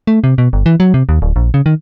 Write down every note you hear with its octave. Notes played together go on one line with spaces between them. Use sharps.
A3
C3
B2
G1
E3
F#3
C3
D#2
D1
A#1
C#3
D#3